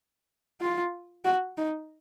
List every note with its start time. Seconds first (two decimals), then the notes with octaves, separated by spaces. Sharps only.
0.61 F4
1.25 F#4
1.57 D#4